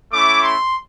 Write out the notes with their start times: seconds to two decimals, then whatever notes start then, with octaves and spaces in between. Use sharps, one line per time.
0.13 A3 C#4 E4 D6
0.43 C6